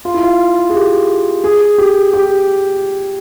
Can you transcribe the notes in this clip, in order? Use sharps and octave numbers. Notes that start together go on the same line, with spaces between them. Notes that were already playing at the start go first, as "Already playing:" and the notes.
F4
E4
F4
G#4
G4
G#4
G4
G4